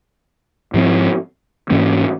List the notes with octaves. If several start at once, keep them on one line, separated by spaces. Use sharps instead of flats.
G#2 F3 C4
G#2 E3 A#3 C#4